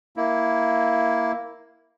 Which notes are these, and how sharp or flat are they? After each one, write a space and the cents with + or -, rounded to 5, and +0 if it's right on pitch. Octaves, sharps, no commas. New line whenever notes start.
A#3 +0 E4 +0